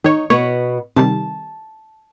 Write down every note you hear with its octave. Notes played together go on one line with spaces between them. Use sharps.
D#3 D#4 C#5
B2 B3 C#5
C3 D#3 G3 A5